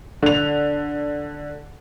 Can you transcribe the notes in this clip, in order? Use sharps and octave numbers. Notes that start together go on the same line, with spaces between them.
D3 F7